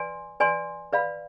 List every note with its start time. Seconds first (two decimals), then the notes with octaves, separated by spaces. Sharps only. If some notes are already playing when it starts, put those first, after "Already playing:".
Already playing: B4 D5 G#5 C6
0.40 B4 D5 G#5 C6
0.93 B4 D5 F5 B5